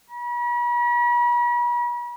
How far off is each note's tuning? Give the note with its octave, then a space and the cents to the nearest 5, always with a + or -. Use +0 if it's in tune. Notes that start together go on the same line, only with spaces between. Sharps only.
B5 -40